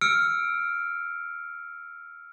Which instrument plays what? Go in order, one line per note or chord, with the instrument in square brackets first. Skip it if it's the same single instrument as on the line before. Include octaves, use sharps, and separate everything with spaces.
[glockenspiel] E6 F6 C#7 D7